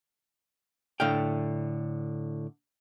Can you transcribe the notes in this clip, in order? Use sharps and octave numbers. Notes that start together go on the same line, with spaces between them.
A2 D3 F5 G5